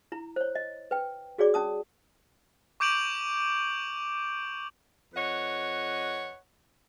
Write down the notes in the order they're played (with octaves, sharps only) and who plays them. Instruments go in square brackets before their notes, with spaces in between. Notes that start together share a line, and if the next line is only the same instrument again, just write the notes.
[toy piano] E4 A#5
C5 C#5
D#5
B4 G5
F#4 G#4 C#5 D5 D6
C#4 A5 D#6
[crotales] C#6 D6 G6 D7 F7 F#7
[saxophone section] F2 B4 C#5 D#5 F#5